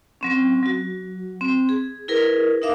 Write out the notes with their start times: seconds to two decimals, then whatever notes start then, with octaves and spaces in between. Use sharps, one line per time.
0.21 F#3 C4 C#4
0.63 F#3 F#4
1.41 C4
1.69 G#4
2.08 E4 G#4 A#4 B4
2.62 D#4 A#4 E5 F5 D6